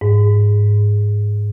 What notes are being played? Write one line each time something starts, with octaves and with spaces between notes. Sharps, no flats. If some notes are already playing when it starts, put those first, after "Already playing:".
G#2